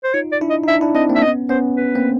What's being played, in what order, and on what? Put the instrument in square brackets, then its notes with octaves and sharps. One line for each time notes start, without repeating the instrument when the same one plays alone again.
[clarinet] C5
[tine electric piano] D#4 F4 [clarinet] C#5
[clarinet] D5
[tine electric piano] D4 E4
[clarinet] D#5
[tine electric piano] D#4
[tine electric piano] D4 E4 [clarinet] E5
[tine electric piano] D4 E4
[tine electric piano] C4 D4 [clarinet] D#5
[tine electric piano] A#3 C4
[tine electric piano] D4 [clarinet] E5
[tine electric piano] B3 C#4 [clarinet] D#5
[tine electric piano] B3 C#4 [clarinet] C5
[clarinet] B4
[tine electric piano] A#3 C4